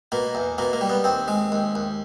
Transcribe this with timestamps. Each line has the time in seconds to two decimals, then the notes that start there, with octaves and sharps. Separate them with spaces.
0.12 B2 A#3
0.35 E2
0.58 B2 A#3
0.73 A#3
0.81 G3
0.89 B3
1.04 D#2 C4
1.28 G#3
1.52 D#2
1.75 D#2